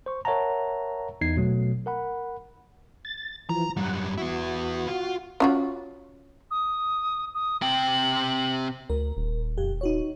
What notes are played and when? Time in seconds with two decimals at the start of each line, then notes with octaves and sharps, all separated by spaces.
0.06 C5 C#6
0.25 A#4 C#5 E5 F#5 A5 A#5
1.21 E2 D#4 G#6 C7
1.36 G1 B2 F#3 A3
1.86 A#4 F#5 B5
3.05 A6
3.49 E3 F3 A#5
3.77 F#2 G3 F#5
4.18 B3 E4 F#4
4.88 F4
5.40 C#4 F4 F#4
6.51 D#6
7.34 D#6
7.62 C3 G5 F#7
8.90 D2 A#4
9.17 D#1
9.58 F2 G4
9.81 D#4 F#4 C#5